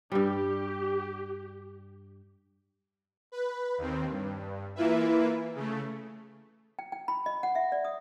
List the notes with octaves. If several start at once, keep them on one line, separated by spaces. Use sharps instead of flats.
G2 G3 G4
B4
D#2 D#3 C4
G2
E3 A#3 E4 F4 B4 E5
C#3 A3
G5
G5
B5
D#5
F#5
E5
D5
D#6